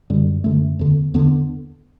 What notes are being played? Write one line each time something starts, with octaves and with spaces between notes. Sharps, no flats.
F#2 D3 G3
F#2 D3 A3
E2 D3
E2 D3 B3